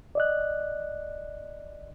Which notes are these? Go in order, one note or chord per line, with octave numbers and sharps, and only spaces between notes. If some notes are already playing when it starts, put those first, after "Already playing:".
D5 D#5 F#6